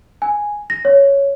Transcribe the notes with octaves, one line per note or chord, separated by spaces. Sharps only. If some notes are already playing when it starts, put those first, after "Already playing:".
G#5
A#6
C#5